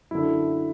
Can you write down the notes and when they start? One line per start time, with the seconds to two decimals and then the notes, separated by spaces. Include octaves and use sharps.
0.11 F#2 D3 E4